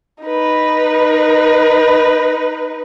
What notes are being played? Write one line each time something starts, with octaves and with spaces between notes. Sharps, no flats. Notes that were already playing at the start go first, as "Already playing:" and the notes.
D#4 B4